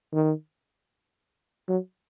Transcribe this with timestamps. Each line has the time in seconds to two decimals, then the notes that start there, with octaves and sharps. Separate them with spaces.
0.13 D#3
1.68 F#3